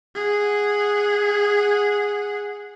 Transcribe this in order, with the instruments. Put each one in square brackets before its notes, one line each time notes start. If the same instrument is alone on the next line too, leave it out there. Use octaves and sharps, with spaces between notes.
[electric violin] G#4 F#5